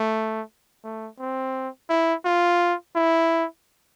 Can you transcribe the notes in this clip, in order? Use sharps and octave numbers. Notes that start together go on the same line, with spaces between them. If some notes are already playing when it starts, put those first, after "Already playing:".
Already playing: A3
A3
C4
E4
F4
E4